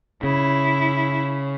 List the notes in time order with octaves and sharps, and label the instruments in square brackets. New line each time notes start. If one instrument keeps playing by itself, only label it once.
[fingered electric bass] C#3 [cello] E4